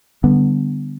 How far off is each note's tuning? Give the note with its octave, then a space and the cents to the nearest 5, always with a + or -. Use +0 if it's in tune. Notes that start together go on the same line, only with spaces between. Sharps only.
D3 +0 G3 +0 B3 +5